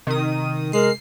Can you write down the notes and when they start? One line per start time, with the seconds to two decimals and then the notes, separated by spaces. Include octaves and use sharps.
0.07 C3 D#3 D#6
0.73 G#3 A#4 C7